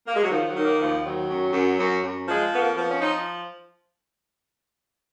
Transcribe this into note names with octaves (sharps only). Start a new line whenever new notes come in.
A#3
G#3
F#3
D#3 F3
F#3
D#3
A#3
D#2 F3
D#3 F#3
F#2
F#2
F#2
F#2
F3 G#3
F2 B3
A#3
F3 B3
C#4
F3 D#4